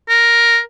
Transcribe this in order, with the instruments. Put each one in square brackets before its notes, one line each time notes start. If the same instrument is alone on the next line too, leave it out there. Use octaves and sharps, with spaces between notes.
[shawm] A#4